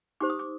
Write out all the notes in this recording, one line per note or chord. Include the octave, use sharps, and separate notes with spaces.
D#4 G4 C5 D6
D#6
D6